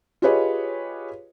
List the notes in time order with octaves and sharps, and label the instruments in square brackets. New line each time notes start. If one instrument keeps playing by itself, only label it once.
[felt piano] F4 G4 G#4 B4 C#5 D#5